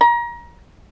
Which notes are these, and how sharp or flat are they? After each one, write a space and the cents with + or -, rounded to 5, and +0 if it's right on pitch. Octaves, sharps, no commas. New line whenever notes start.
A#5 +30